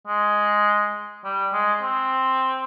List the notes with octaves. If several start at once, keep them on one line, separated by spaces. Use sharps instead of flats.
G#3
G3
G#3
C4